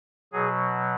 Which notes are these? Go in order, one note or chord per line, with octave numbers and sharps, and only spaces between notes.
B2 F#3 G#4